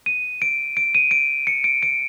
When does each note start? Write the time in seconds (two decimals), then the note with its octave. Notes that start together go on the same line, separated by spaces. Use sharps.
0.06 D#7
0.42 D7
0.77 D7
0.95 D#7
1.11 D7
1.47 C#7
1.64 D7
1.83 D7